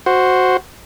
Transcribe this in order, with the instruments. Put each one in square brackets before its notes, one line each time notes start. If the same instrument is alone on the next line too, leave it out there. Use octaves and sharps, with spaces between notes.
[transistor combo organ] F#4 C5